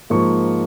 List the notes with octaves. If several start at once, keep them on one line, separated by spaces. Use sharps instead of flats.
G#2 F3 A#3 C#6